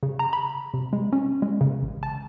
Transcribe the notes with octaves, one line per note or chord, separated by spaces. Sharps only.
C#3
A#5
B5
C3
G#3
C#4
G#3
C#3
A1
A5